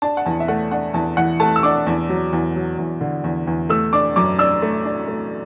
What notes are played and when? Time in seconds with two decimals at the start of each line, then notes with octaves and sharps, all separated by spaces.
0.02 D4 A5
0.17 F#5
0.26 E2 A5
0.40 E5
0.48 A3 F#5
0.71 D4 F#5
0.94 E2 A5
1.17 E3 F#5
1.40 A3 A5
1.56 E6
1.63 D4 D6
1.87 E2
2.09 F#3
2.33 E2
2.56 F#3
2.78 E2
3.01 D3
3.24 E2
3.47 E2
3.70 A3 E6
3.93 D4 D6
4.16 F#2 D6
4.38 D4 E6
4.62 A3
4.85 D4
5.08 A3